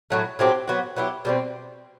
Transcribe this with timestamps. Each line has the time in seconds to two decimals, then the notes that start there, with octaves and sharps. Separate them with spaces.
0.10 A2 F#3 A3
0.39 A2 F#3 C4 G4
0.68 F#3 B3 F#4
0.96 F#3 B3 E4 G4
1.25 B2 G3 C4